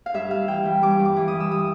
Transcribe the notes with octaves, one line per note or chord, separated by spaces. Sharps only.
F5
G2 E5
G2 F5
E3 G5
G3
G2 D6
G2
D6
E3
D#6
G3
E6
D#6